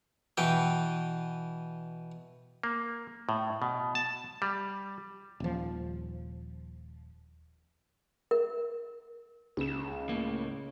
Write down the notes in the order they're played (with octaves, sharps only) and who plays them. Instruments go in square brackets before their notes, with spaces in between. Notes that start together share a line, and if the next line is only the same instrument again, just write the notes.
[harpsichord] B2 E3 B4 G5
[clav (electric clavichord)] A#3
A2
B2
A5
G3
[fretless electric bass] D#1 F3
[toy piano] A#4
[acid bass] C#2 [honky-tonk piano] C#3 E7
[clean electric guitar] A2 A#3